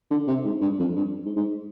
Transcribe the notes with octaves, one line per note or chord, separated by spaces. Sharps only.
D3
C3
G#2
G2
F2
G2
G#2
G#2